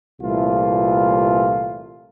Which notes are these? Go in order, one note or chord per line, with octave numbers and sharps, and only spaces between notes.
C2 A#2 E3 A3 F4